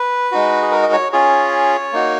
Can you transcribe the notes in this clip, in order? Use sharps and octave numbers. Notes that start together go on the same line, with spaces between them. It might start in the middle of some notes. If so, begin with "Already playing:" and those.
Already playing: B4
G#3 D#4 F#4
G#4
A#4
D#5
C#5
C#4 F4 G#4 C#5
A#3 D#4 F#4